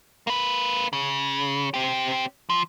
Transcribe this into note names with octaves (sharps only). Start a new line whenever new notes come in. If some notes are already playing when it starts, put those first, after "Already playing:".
A#3 B4
C#3
C4 G4
F3